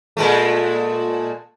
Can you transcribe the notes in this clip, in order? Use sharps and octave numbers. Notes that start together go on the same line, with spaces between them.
A#2 G#3 A3